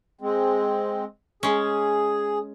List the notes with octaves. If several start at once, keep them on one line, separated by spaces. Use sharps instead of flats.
G#3 C4
G#3 C#4 G#4